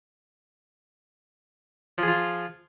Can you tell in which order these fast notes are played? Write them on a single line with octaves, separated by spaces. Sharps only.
F3 G#4 F4